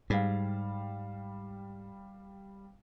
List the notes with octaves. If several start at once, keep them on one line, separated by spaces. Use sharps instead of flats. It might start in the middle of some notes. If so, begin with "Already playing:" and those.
G#2 G3 F5